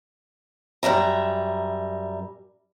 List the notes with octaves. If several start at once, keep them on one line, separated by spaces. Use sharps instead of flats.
F#2 G3 E5 A#5